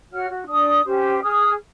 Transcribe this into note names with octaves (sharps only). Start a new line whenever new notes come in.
F#4 C#5 F#5 F6
F#4
D4 D5 D#6
C#4 G4 C5
G#4 D#6 F6